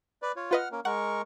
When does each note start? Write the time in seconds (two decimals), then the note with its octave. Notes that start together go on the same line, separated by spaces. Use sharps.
0.22 B4 D5
0.36 F4 C#5
0.51 F4 B4 D#5 F#5 F6
0.72 A#3 C#4 A#4
0.85 G#3 A#4 F#5 C#6